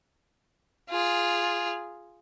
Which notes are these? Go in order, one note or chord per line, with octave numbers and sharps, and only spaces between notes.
F4 G#4